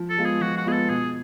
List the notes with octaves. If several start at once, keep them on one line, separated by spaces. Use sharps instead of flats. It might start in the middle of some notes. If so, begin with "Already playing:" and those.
Already playing: F3
A4
G#3 B3 F4
G#4
F3 F#4
F#4
G#3 B3 F4 G#4
A4
B2 G#4